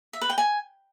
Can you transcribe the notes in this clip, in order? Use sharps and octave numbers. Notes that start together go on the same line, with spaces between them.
E5
B4
G5
G#5